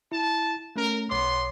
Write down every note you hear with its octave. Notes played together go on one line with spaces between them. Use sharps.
E4 A5
A3 C#4 A#4
B1 B3 C#5 C6 D6